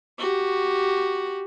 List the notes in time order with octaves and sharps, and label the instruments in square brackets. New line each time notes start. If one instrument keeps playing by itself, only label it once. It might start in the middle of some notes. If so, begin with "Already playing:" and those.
[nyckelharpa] F#4 G4